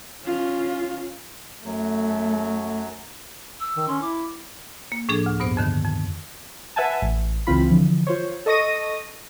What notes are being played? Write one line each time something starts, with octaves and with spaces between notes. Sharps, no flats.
C#4 F4
F#2 F#3 A3
E6
D#3
C#4 C6
E4 D6
A#3
A2 F3 D4 G#4 A4 G#6
D2 D6
G2 B2 B3 C5
F2 D3 D#3
F2
B4 E5 F#5 G#5 A5
A1
C#2 C#3 E3 C4 F4 B5
D3 E3 F3
F4 C5 C#5
A4 D#5 C#6 A#6 D#7